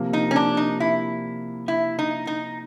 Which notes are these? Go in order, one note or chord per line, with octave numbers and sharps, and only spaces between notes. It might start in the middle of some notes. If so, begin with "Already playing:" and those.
Already playing: C3 F3 A#3
D#4
C#4
D4
D#4
E4
E4
D#4
D#4